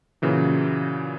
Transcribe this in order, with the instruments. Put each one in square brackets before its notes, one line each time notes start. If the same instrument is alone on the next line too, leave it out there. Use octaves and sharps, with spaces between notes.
[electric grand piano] A#2 C#3 E3 F#3